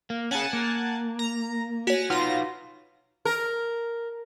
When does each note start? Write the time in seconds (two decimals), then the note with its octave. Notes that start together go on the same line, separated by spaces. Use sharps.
0.10 A#3
0.31 C#4 G#4 F#5 G#5 A5
0.53 A#3
1.19 A#5
1.87 F#4 C#5 F#5 G#5 A#6
2.10 D#4 F4 B4 F#5 A#6
3.25 A#4